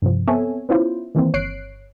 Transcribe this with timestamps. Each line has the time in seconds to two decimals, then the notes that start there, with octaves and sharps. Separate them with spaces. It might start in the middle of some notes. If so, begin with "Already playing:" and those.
0.02 G2 C3 F3
0.27 B3 C4 A4 C#5 E5 G#5
0.69 B3 C#4 E4 F4 C5
1.15 D#3 E3 A#3 C4
1.34 G1 C#5 F#6 C7 D7